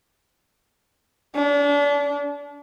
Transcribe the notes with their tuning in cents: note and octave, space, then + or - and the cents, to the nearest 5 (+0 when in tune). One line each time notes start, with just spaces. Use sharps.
D4 -35